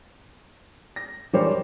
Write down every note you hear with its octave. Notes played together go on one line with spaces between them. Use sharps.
A#6
E3 G3 D4 A#4 C5 C#5